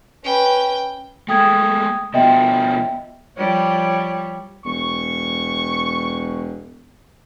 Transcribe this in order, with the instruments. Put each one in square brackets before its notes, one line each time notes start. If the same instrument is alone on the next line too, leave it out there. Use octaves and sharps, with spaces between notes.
[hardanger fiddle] C#4 B4 [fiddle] G5
[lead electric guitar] G#3 A3 [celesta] G5 D#6 G#6
[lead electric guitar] B2 F3 [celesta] D#5 E5 G5
[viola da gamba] F3 G3 C#5
[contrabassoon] E1 [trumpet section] C#6